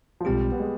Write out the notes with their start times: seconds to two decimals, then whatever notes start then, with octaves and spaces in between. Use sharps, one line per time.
0.20 F3
0.25 B1 B2 G3 G#3 C4 F4
0.52 B3
0.60 G#3